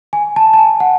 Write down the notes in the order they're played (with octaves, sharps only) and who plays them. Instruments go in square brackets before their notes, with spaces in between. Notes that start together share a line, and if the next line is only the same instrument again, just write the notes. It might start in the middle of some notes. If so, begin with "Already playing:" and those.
[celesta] G#5
A5
A5
G#5
F#5